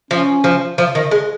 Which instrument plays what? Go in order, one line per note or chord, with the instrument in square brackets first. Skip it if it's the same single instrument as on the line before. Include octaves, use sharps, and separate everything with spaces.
[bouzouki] F3 [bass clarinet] C#4
[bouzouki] F3
F3
D#3
G#3